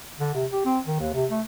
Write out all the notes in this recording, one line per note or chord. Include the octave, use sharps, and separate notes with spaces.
D3
C3
G4
C4
D#3
D#2
C3
A3